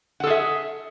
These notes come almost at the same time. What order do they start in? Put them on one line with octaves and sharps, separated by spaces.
F#5 A4 G#4 E5